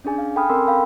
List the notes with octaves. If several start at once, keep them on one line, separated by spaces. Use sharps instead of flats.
C#4 D4 G#4 G#5
F5
A4 G5 G#5 B5 D#6 F6
C4 C#4 A4 A#4 C6 E6
A4 F5 G5 B5